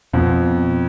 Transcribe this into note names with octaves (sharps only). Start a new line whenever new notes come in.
F2 B2 B3